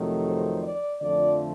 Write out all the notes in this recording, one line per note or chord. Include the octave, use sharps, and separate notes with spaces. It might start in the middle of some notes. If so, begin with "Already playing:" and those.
Already playing: F2 C3 D#3 F#3 A3
C5
D5
F2 D3 F3 A3 D5